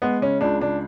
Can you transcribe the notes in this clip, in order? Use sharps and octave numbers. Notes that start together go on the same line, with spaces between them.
G#3 B3
C#3 C#4
C#2 D4
C#2 D4